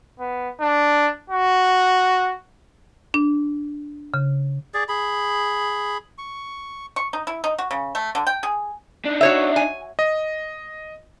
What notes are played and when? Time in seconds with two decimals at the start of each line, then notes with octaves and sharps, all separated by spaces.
0.19 B3
0.61 D4
1.30 F#4
3.14 D4
4.14 C#3
4.74 G#4 D5
4.89 G#4 B5
6.18 C#6
6.96 C#6
7.13 D#4
7.27 E4
7.44 D#4
7.58 F#4
7.71 C#3
7.95 A3
8.15 D3
8.27 G5
8.43 G#4
9.06 D4 D#4
9.21 F#4 C#5 E5
9.56 G#5
9.99 D#5